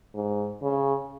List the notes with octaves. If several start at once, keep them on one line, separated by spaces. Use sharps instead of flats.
G#2
C#3